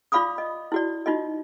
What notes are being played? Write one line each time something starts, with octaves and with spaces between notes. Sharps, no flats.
F4 D5 F5 B5 D6 D#6
D#5
E4 F#4 D5
D#4 F4 F#4 D#5